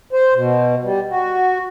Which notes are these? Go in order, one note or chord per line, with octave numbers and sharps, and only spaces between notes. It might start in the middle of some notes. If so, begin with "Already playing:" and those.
C5
B2
G3
F#4